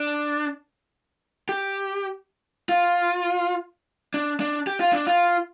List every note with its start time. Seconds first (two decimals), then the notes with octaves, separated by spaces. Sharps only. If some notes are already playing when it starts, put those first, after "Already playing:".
Already playing: D4
1.49 G4
2.69 F4
4.14 D4
4.40 D4
4.67 G4
4.80 F4
4.93 D4
5.07 F4